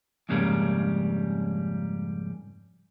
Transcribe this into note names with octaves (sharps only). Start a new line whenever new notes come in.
F2 G#2 C#3 G3 A#3